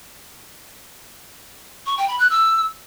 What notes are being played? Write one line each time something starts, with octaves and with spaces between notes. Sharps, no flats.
C#6
G5
B5
F#6
E6